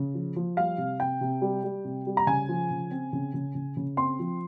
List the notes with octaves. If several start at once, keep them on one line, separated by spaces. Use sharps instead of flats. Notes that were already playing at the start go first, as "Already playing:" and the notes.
Already playing: C#3
F3
F3
G3 F5
C3
C3 G5
C3
G3
G3
C3
G3
A#5
C#3 G#5
F3
C#3
C4
C#3
C#3
C#3
C#3
C4 C6
F3